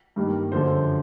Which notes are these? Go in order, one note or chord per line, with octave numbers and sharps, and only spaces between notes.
G2 D#3 G3 A#3
F#2 D3 F3 C5